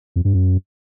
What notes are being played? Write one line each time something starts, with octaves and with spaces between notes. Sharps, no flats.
F2
G2
F#2